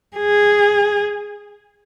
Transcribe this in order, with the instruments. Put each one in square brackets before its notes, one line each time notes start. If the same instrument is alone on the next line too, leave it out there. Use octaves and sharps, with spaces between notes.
[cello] G#4